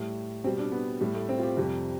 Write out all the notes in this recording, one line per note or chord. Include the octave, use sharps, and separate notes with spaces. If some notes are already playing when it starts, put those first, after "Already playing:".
Already playing: A2 G3
B2 G3 C4
D4
B3
A2 G3
A3
C4
F4
G4
F2 C3 G3